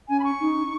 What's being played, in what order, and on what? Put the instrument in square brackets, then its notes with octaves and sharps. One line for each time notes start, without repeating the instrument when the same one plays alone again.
[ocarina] C#4 [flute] G#5
[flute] B5
C#6
[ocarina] D#4